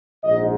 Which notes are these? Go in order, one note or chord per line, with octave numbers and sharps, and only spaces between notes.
A#1 G#2 D#5